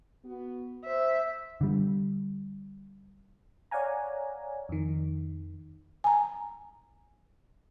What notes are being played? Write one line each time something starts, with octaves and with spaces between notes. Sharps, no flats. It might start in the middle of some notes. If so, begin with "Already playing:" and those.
B3 F#4
C5 E5
D3 G3
C#5 D5 F5 F#5 G#5 A#5
F2 D#3
G#5 A#5